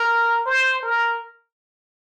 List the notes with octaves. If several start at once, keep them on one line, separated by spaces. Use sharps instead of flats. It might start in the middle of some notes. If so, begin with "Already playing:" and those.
Already playing: A#4
C5
A#4